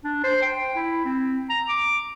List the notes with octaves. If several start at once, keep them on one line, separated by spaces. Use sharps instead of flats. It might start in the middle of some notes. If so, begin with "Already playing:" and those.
D4
C5
G5
E4
C4
A#5
D6